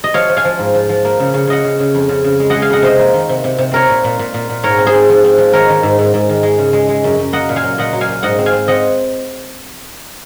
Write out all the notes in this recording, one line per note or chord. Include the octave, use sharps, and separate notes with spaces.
D#5
F3 C#5 F5
F3
F5 G#5
F3
G#2
F3
F3
A#3
C#3
C#3
C#3 D#5 F#5
C#3
C#3
F2
C#3
C#3
G#3
G#3 D#5 F#5
F5 G#5
F2 D#5 F#5
C3 C5 D#5
A#3
D#3
C3
C3
C3
C4 A#4 C#5
A#2
A#2
A#2
A#2
A#2
G#2 A#4 C#5
C4
G#4 C5
C4
F3
C4
F3
D#3 A#4 C#5
D#3
G#2
G#2
G#2
D#3
G#3
C#3
G#3
G#3
F#2
F#2
A#3 D#5 F#5
A#2
F5 G#5
F#3
A#2 D#5 F#5
F#3
F5 G#5
A#2
G#2 D#5 F#5
C4
F5 G#5
C4
C4 D#5 F#5